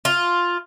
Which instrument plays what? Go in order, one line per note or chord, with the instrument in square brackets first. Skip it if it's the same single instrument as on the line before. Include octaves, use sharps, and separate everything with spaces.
[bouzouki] F4